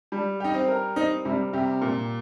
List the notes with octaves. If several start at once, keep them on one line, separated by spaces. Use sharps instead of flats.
G3
D#4 G4
C4
A#4
C4 D#4
C3 G3
C3 G4
A#2